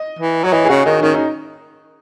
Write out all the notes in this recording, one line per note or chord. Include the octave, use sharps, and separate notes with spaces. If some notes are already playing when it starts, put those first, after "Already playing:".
Already playing: D#5
E3
F#3 C#5
E3 D#5
G#4
C#3 F#4
D#3 D#4
D#3 C#4
D#4